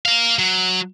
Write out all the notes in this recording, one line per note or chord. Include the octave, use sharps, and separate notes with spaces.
A#4 F5
F#3